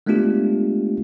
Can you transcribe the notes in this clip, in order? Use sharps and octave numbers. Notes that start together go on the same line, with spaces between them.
G#3 A3 B3 D4 F4 G4